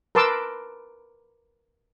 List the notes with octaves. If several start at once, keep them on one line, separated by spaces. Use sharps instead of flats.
A#4 B4 A5 C6 D6 E6